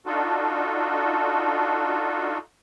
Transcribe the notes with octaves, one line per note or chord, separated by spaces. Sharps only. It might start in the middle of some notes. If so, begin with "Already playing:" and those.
D4 D#4 F4 F#4 A4